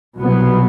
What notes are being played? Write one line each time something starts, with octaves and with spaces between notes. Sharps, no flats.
C2 B2 F#3 B3